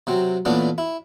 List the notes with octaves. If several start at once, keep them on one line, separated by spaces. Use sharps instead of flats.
C3 F#3 C4
A#2 E3 A3 B3 C#4 D4
E4